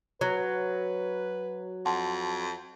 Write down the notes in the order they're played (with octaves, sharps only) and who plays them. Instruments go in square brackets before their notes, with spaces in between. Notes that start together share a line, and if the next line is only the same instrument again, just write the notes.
[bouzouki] F#3 [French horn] B4
[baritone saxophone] F2 [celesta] F#5 A5 C6